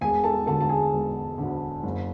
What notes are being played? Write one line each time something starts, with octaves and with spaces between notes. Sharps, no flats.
E1 G#4 G#5
A4 A5
D2 D3 A4 A5
A5
G#4 G#5
E1
D2 D3
F#1